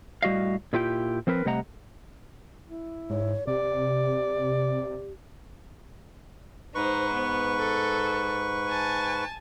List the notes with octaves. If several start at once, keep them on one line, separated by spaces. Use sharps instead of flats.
A2 G3 F#4 D#5 F5
A#2 E4 F4 G4 G5
F3 C4 A#4 B4
C3 G3 A3 D#5 F#5 A#5
E4
G#2 C#5
C3 G4 D5
G#2 D#4 B4 C5 C#6
B3
A4
G#5 A5